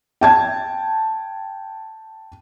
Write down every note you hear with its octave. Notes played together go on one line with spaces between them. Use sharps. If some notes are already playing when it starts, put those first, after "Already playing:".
G5 A5 G#6